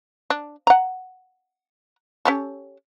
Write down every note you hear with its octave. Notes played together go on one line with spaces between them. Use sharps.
D4
F#5 A#5
C#4 G4 A4